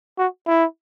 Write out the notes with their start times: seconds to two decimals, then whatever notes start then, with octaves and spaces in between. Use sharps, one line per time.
0.18 F#4
0.47 E4